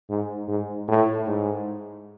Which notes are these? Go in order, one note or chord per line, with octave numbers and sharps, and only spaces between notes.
G#2
G#2
A2
G#2